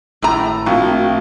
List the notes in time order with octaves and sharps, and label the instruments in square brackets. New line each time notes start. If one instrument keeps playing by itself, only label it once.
[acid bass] G#1 [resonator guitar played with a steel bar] A2 A#5
[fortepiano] A#1 [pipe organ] A3 C4 F#4